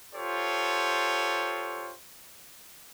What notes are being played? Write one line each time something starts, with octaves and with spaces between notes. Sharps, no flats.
F4 G4 A4 C5 C#5